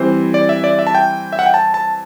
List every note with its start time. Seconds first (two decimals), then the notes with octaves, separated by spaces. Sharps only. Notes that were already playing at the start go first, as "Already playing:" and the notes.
Already playing: E3 G3 C4 C5
0.34 D5
0.49 E5
0.64 D5
0.79 E5
0.87 A5
0.95 G5
1.33 E5
1.39 F#5
1.46 G5
1.54 A5
1.74 A5